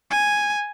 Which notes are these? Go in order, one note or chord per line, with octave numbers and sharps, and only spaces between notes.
G#5